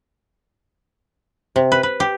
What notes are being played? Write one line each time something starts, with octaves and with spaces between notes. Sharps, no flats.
C3
B4
B4
G4